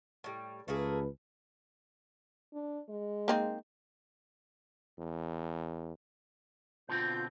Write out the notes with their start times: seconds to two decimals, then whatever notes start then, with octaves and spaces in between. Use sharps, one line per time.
0.24 A2 G3
0.68 C#2 A3 A#3 G#4 B4
2.54 D4
2.89 G#3
3.28 A#3 C4 D#4
4.98 E2
6.89 B2 D3 C4 F4 G6